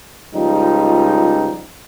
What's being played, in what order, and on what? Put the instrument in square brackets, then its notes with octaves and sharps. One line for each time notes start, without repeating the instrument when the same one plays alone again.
[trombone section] C#2 F3 G3 D#4